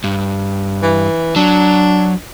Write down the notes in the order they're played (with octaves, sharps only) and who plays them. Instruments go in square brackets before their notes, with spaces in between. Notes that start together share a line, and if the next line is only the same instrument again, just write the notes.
[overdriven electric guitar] G2
[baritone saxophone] E3
[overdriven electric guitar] F#3 [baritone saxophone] D4